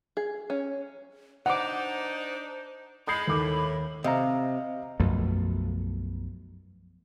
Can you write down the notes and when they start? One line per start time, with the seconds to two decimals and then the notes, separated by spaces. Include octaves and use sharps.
0.17 G#4
0.50 C#4
1.46 D4 D#4 C5 F#5 D6
3.07 G#3 B5 D#6 G6 C7
3.27 D#2 A2 A4 D6
4.04 C3 D#5 F5 A#5
5.00 B1 F#2 F3 A3